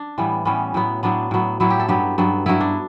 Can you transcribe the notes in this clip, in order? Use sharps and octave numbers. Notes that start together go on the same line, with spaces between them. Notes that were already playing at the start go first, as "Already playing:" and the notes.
Already playing: D4
A2 E3 G3 B3
A2 E3 G3 B3 C#4
A2 F#3 B3
A2 F#3 B3 D4
A2 F#3 B3
A2 F#3 B3 E4
G4
A4
G2 F#3 B3 G4
G2 F#3 B3
G2 F#3 B3 E4
D4